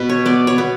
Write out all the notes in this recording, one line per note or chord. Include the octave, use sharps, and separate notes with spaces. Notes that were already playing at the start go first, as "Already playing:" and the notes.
Already playing: B2 B4
C#5
B3 D5
C#5
B3